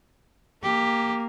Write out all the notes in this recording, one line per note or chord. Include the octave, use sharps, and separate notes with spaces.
A#3 G4